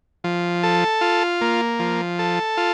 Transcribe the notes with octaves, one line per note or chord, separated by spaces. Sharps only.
F3
A4
F4
A#3
F3
A4
F4